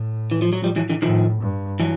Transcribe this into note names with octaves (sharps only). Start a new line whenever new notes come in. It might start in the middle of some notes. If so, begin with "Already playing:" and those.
Already playing: A2
E3
F3
F#3
F3 G3
E3 F#3
D3 E3
A2 D#3 F3
G2
E3 F#3